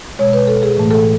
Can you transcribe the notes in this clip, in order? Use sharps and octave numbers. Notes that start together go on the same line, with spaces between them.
B2 G#3 C#5
B4
A4
G#4
A2 E3 A3
A4